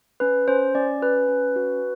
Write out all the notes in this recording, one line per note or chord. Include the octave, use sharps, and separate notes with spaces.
C#4 B4
C#4 C5
C#4 D5
F#4 B4
C#4
F#4